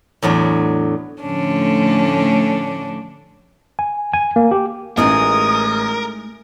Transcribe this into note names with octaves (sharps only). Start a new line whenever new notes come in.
E2 A2 F#3 D4
A2 D3 F3 A3 C#4 D4
G#5
G#5
A#3
G4
A1 G#3 A3 D#4 A#4 D#6